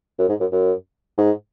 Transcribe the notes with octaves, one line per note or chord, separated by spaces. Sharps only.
F#2
G#2
F#2
F#2
G#2